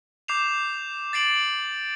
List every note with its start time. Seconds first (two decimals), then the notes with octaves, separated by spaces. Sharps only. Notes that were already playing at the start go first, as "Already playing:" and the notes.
0.28 D6 G6 C7 E7 F7
1.13 A6 C7 D7 F#7